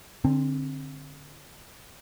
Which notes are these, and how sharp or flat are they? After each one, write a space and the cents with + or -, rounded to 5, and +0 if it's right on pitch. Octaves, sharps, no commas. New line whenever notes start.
D3 +0 C4 +25